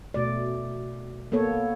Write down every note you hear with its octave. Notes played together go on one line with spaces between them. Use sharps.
B2 A3 D5
A#3 B3 A4 C#5